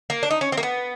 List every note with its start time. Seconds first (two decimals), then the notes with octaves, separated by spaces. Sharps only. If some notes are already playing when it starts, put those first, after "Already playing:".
0.10 A#3
0.23 D4
0.31 D#4
0.41 C#4
0.52 C4
0.58 A#3
0.63 B3